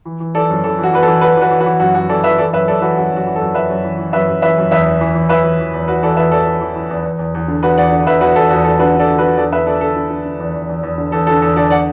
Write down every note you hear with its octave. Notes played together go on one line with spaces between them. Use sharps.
E3
E3
E3 A4 D5
F#2
E3 A4
E3 F#4
E3 B4
A4
E3
E3 F#4 B4
E3 F#4 B4
E3
F#4 B4
E3
F#2 F#4
F#2 F#4
E3 A4 D5
E3 B4 E5
E3 A4 D5
F#2 B4 E5
F#2 A4 D5
E3 F#4 B4
F#2 F#4
F#2 F#4
E3
A4
F#2
F#2 B4 E5
F#2
E3
E3
F#2 B4 E5
F#2
E3 B4 E5
F#2
E2 B4 E5
E2
E3
E3
E3 B4 E5
E3
E3
E2
E2 F#4 B4
E3 A4 D5
E2 B4 E5
E3 A4 D5
E3
E3
E3
E2
E2
E2
E2
D3
E2 F#4 B4
E2 D5 F#5
D3
E2 B4 E5
E2 F#4 B4
E2 A4
E2 F#4
E2 A4
D3 F#4 B4
D3 A4 D5
D3
F#4 B4
D3
E2 A4 D5
D3 B4 E5
D3 A4 D5
D3 A4
D3
D3
D3
E2
E2
E2
E2
D3
E2 A4
D3 A4
E2 A4
D3 A4 D5
D5 F#5